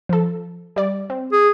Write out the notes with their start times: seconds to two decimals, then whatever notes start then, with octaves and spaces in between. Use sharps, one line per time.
0.09 F3 A4
0.76 G3 D5
1.10 C4
1.32 G#4